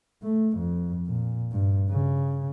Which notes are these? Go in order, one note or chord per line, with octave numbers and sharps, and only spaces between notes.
A3
F2
A#2
G2
C#3